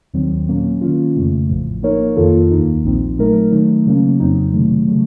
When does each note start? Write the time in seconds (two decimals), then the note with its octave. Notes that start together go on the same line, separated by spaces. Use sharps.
0.14 D#2 D#3 F#3 C4
0.48 A#2 F#3 A#3 C#4
0.81 D#3 A#3 C#4 F4
1.16 F2 C#3 A3
1.49 A1 A2 F3
1.83 F3 A#3 D#4 A#4 C#5
2.16 F2 D#3 A#3 F4 A4
2.51 D#2 D#3 A#3 D#4
2.85 A#1 A#2 F3 C4 D#4
3.18 A#2 F#3 A3 D#4 A#4
3.52 D#3 F#3 A3 D#4
3.87 C#3 F#3 A#3 C#4
4.20 F2 C#3 F#3 C4 D#4
4.53 C3 D#3 F#3 A3
4.88 C#3 F#3 A3